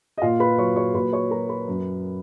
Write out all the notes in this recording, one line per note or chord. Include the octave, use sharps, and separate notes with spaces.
D#5
A#2 F4 F5
B4 B5
F#3 C#5 C#6
C#5 C#6
A#2 B4 B5
C#5 C#6
F#3 A#4 A#5
B4 B5
F#2